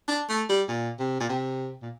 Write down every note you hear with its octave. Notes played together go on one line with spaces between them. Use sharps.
D4
A3
G3
A#2
C3
A#2
C3
A#2